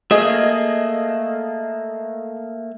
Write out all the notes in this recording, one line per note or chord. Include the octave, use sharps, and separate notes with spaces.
A3 A#3 G#4 D#5